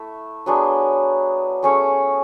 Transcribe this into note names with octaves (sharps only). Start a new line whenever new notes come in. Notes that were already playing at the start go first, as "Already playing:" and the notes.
Already playing: A3 E4 E5
F#3 B3 D4 G#4
A3 C#4 G#4 C#5